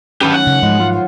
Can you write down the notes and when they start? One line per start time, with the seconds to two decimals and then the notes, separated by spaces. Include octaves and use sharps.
0.21 D#3 F#3 C#4 G4 B4
0.34 D#3 A3 F#5
0.47 C#3
0.63 G#2 F3 G#3 B3
0.80 F4
0.93 F#4 C5 C#5